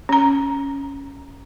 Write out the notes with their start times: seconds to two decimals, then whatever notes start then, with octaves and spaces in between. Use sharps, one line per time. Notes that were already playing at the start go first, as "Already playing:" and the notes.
0.09 C#4 A#5